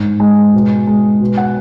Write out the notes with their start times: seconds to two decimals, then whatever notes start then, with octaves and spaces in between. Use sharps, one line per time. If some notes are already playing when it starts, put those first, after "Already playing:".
Already playing: G#2
0.20 G#3
0.54 B2
0.87 G#3
1.20 B2
1.37 F#5